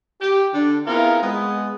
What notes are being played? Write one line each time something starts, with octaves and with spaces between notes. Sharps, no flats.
G4
D3 D4
B3 C4 E4 F4 G#4 A#4
G#3 B3